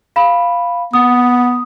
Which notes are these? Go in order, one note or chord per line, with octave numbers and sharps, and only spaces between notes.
F5 B5
B3 D#6